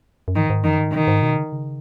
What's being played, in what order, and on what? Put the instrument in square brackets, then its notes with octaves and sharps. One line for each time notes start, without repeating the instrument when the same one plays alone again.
[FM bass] F#2
[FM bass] G#2 [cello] D#3
[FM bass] G#2
[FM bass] F#2 [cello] D#3
[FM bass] G#2
[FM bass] B2 [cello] D#3
[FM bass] G#2
B2
C#3
D#3
C#3